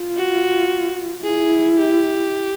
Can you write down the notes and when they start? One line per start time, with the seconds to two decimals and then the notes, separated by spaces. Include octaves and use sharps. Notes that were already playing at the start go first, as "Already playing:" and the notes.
Already playing: F4
0.17 F#4
1.23 E4 G#4
1.78 G4